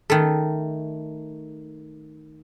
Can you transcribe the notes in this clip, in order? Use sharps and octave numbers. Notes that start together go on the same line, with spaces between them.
D#3 A3